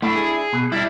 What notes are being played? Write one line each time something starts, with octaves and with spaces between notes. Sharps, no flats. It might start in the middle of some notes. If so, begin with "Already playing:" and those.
A3 D4 E4
G#4
B2
G3 D4 E4